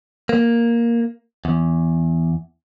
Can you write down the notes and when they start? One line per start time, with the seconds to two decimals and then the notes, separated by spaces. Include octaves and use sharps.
0.29 A#3
1.45 E2